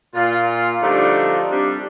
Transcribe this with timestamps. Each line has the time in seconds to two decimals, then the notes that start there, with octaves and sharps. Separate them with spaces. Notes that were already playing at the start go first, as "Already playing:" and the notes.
0.14 A#2 F4
0.81 D3 F3 G3 A3 D4 D#4
1.50 C3 G3 D4